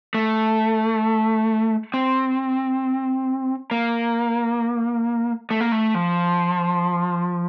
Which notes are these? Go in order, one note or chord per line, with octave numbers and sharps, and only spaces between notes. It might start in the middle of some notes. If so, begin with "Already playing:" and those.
A3
C4
A#3
A3
A#3
A3
F3